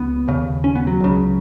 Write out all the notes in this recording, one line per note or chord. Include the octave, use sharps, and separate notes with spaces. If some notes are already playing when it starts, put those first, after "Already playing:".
Already playing: C#2 B3
D#2 C#3
C#4
B3
F#3
C#2 C#3